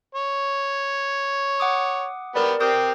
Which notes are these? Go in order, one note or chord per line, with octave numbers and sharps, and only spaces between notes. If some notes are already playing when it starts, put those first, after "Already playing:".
C#5
F#5 D6 D#6
B3 G4 A#4 B4 D5
C4 G4 A#4 D#6 G6